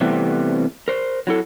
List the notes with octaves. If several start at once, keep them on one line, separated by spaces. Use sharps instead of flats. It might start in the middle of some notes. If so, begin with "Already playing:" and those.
C3 E3 G3 A3 B3 C4
A#4 C5
F#3 E4 A4